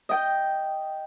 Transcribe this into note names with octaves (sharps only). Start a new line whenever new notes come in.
D#5 G5